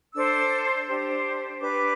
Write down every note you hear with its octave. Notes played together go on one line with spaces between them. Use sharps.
D4 A4 C5 E6
D4 G4 C5
D4 G4 B4 D6